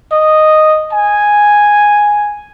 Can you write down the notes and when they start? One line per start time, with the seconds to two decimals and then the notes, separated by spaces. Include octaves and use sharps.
0.11 D#5
0.91 G#5